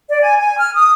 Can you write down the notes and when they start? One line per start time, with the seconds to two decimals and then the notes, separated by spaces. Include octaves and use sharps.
0.09 D5
0.21 G#5
0.39 G#5
0.57 F6
0.74 D#6